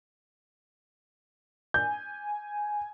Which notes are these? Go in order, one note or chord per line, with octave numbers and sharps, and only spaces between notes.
G#5 G6